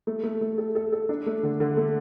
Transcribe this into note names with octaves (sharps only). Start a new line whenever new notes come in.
A3
A3
A3
A4
A4
A4
D4
A3
D3
D3
A3